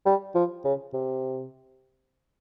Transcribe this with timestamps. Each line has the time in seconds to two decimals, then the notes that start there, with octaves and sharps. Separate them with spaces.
0.06 G3
0.35 F3
0.65 C#3
0.93 C3